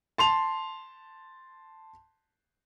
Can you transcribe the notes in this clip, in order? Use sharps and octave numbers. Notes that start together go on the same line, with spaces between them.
A5 C6 F7